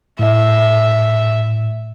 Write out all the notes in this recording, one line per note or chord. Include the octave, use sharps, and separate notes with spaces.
A2 E5